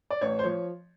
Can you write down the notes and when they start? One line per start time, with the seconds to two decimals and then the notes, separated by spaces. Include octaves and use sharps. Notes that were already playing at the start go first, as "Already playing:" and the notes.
0.10 D5
0.21 A1 C#5
0.39 C5
0.44 F3 C#5